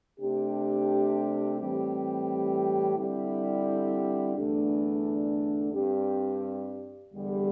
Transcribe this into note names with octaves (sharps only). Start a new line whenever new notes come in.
C3 A3 D4 G4
A2 E3 G3 C4 G4
D3 G3 C4 E4 G4
E2 D3 A3 D4
G2 G3 C4 G4
E2 D3 G3